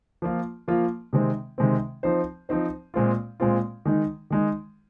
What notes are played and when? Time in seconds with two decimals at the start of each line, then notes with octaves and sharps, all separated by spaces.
0.22 F3 A#3 F4
0.68 F3 A#3 F4
1.13 C3 D#3 G#3 C4
1.58 C3 D#3 G#3 C4
2.03 F3 C4 D#4 C5
2.49 F3 C4 D#4 C5
2.94 A#2 G#3 C4 F4
3.40 A#2 G#3 C4 F4
3.85 D#3 G#3 D#4
4.30 D#3 G#3 D#4